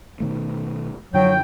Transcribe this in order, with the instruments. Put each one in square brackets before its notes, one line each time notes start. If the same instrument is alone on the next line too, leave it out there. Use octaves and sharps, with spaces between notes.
[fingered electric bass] B2 D#3 A3
[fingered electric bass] F#2 D3 F3 [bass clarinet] F#3 [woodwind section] G5